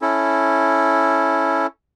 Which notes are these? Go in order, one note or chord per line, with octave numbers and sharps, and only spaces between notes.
C#4 E4 A4